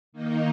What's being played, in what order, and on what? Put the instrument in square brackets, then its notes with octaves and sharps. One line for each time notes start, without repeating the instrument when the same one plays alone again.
[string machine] D#3 A#3 D#4